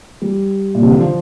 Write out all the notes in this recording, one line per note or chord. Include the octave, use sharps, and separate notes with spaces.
G3
A#2
C3
D3
F3